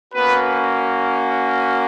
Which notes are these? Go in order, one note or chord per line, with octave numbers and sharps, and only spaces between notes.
A#3 B3 C#4 F#4 B4